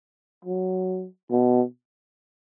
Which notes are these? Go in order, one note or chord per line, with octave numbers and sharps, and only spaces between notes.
F#3
B2